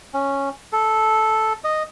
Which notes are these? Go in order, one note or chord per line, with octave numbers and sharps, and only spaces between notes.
C#4
A4
D#5